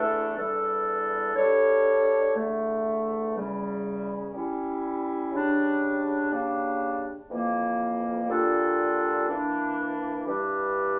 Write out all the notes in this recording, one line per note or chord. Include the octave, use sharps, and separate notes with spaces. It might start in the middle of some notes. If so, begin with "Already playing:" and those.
Already playing: E2 E3 A3 D4 A4
E2 E3 G3 D4 A4
G3 D4 A4 C#5
E2 D3 A3
E2 C#3 G3
G3 C#4 E4
C#3 G3 D4
C#3 G3 A#3 D4
F2 E3 A#3
A#2 G3 D4 F4 A4
E3 A#3 D4
G2 E3 G3 D4 G4